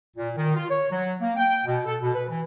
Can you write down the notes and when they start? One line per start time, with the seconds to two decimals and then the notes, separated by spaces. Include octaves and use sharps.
0.16 A#2
0.36 D#3
0.55 F4
0.70 C#5
0.91 F#3
1.20 A#3
1.36 G5
1.66 B2
1.85 A4
2.02 B2
2.14 B4
2.29 E3